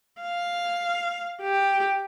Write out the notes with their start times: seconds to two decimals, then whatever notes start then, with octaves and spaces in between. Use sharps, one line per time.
0.22 F5
1.42 G4